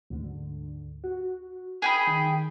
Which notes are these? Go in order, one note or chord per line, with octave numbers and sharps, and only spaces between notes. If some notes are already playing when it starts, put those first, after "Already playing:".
D2 G#2 D3
F#4
G#4 G5 B5
D#3